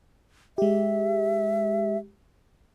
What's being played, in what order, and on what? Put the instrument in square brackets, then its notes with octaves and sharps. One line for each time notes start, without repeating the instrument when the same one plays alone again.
[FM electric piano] G#3 G4 [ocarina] E5